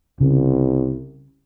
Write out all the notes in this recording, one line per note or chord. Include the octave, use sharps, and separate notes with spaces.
C2 C#3